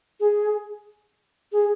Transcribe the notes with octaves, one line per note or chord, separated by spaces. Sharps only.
G#4
G#4